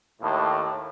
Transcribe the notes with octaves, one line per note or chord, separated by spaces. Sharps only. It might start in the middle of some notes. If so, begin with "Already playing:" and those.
D#2 A2